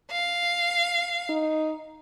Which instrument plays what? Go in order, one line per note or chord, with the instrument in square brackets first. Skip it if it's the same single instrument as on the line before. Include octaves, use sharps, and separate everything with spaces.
[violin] F5
[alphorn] D#4